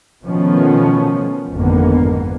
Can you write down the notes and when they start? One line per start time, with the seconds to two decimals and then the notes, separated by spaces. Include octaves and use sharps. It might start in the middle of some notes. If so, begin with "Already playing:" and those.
0.24 B2 D#3 F3 A3 B3 C#4
1.52 G#1 F2 G#2 D3 A#3 B3